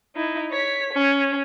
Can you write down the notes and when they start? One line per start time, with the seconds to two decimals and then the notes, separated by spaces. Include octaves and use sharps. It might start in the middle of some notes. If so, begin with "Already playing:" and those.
0.15 D#4 E4
0.51 C#5 B6
0.93 C#4